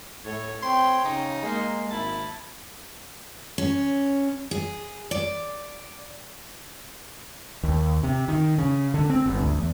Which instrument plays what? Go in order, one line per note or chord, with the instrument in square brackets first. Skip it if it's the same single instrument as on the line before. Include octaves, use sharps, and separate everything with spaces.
[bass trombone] A2 [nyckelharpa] A4 C#5
[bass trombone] C4 [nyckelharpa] C#5 G5 [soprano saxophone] C6
[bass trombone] C#3 [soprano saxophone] D#4
[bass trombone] G#3 [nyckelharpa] A#3 C6
[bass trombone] G#1 [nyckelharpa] E4 [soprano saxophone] A5
[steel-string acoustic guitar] C#4
G#4
D5
[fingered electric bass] D#2
C3
D#3
C#3
D3
C4
G1
D2
E2